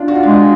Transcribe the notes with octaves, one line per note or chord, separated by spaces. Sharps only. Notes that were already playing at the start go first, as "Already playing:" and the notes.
Already playing: D4 F4
F#4
F4
G#3 D4
F4